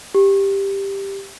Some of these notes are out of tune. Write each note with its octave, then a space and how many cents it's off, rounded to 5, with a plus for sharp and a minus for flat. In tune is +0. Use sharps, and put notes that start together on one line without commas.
G4 +5